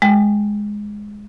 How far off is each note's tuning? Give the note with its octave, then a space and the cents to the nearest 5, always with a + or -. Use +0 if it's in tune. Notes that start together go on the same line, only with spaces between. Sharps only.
G#3 +0 G5 +0